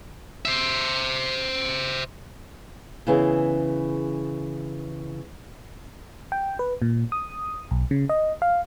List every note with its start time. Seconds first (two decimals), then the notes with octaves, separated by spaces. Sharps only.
0.45 C5 E5
3.07 C#3 E3 B3 E4 G#4
6.32 G5
6.59 B4
6.82 A#2
7.12 D#6
7.71 B1
7.91 C#3
8.09 D#5
8.42 F5